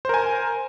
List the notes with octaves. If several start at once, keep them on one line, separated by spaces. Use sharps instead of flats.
A#4 C5 G#5